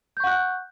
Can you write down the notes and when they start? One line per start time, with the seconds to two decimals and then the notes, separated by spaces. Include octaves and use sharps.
0.17 G6
0.20 C#6
0.24 F#5
0.27 F#6